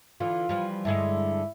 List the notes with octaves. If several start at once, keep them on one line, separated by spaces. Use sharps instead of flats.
D3 E3 F4
E3 F3 G3
G2 D3 G#3 E4